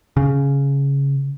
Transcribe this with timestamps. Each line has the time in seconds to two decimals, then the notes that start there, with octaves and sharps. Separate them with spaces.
0.17 C#3